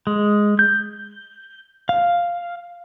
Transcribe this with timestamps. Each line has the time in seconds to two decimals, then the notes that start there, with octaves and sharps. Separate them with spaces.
0.07 G#3
0.59 G6
1.89 F5